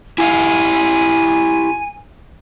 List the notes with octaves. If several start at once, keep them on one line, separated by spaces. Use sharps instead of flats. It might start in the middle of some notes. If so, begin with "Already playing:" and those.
E4 G4 F5 G#5